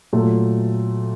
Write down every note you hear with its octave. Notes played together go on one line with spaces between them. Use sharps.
A#2 F#3 A3